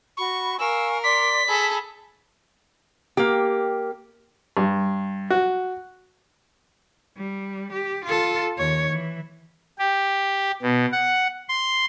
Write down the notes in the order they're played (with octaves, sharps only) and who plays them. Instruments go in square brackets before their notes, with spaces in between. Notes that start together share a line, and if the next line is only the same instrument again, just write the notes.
[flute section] F#4 B5 [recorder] C#6
[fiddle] A#4 [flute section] F5 G#5 C#6 [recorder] E6
[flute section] D5 C6 D6 [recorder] B6
[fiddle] G#4 A4 [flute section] A5 B5 E6
[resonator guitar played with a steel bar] A#3 G4
[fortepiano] G2
F#4
[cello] G3
G4
F4 A4
D#2 C#5
E3
[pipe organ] G4
B2
F#5
C6